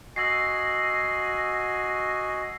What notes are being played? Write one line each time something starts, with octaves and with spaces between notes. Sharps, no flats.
F#4 D#5 G#5 E6 A#6 C7